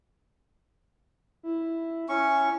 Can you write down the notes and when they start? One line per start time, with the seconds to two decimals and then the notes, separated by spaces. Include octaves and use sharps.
1.43 E4
2.09 C#4 E4 C#6